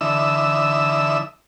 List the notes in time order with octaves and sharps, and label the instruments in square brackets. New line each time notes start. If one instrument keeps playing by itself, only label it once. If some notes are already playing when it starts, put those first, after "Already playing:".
[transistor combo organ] D3 E3 D#5 E5 E6